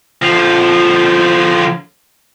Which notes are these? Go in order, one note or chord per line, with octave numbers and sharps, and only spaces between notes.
D3 F3